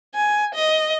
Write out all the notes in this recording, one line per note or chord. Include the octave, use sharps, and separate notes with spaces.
G#5
D#5